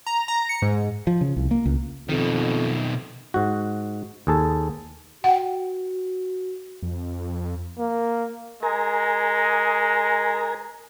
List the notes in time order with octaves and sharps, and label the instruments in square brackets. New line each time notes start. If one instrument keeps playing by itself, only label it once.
[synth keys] A#5
A#5
C#7
G#2
[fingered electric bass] F3
C#3
C2
A#3
C#2
[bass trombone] F2 [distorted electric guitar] B2 D#3
[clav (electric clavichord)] G#2 F#4
D#2 G#4 A4 A5
[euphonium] F#4 [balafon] F#5 G5
[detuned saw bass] F2
[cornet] A#3
[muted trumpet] G#3 [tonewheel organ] A#4 G#5 A#5